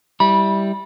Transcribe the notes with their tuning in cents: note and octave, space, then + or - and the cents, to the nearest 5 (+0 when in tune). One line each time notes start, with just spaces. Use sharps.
G3 +0 E4 -10 B5 -20